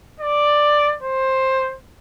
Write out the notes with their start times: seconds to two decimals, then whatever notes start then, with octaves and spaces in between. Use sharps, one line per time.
0.20 D5
1.03 C5